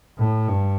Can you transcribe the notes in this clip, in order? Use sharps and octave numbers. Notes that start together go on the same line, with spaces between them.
A2
G2